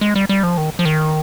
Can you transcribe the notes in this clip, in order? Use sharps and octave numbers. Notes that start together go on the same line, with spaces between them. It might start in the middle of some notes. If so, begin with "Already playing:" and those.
G#3
G3
G3
F3
D#3
F3
D#3